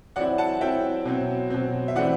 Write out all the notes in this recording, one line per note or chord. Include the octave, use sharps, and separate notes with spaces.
F#3 C4 E4 D5 F#5
F#5 A5
F#3 C4 E4 E5 G5
B2 F#3 C4
B2 F#3 C4
E5
E3 A3 C4 D5 F#5